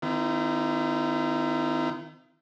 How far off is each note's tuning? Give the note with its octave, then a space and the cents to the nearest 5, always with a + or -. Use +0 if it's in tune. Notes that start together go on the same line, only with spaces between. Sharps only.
D#3 +0 C4 -40 E4 +35